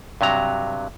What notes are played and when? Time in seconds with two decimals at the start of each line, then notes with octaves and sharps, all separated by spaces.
0.21 G2 C3 F#3 A#5